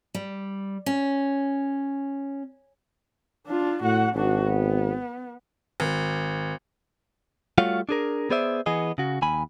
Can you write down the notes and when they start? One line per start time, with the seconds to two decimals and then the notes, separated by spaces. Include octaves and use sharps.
0.15 G3
0.86 C#4
3.47 D4 F4
3.82 A2 F#4 F#5
4.15 G#1 D4 F#4
4.46 B3
5.80 G#1
7.58 G3 A3 F4 F#4 C#5 F5
7.89 D4 G#4 A#4
8.30 B3 G#4 C5 D5 E5
8.66 E3 B3 G#4 D#5
8.98 C#3 F#4
9.22 D#2 G#5 B5